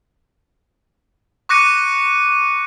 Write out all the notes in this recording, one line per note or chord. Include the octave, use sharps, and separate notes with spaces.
C#6 D6 F#6 A#6 C#7 D#7